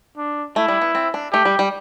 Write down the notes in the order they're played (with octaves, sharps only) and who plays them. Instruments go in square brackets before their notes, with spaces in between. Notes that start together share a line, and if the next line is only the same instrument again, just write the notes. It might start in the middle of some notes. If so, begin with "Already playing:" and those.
[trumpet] D4
[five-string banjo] A3 [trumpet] E4
[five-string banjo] G3
B3
C4
D4
[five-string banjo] A3 [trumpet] G4
[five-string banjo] G3
G3